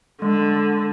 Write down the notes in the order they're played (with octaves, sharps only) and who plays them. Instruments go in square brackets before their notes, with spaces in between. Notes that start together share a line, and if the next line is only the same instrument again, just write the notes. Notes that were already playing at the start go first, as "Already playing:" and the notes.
[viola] D3 [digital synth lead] G#3